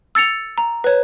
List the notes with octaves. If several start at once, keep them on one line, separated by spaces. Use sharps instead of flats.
E6 A6 C#7 F7
A#5
B4 C#5